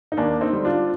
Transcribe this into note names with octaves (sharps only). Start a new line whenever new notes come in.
D#4
D#2 A#3 D4
C4 D#4
D3 G3
D4 F4